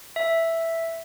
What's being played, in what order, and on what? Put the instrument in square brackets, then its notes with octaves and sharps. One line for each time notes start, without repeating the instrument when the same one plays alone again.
[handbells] E5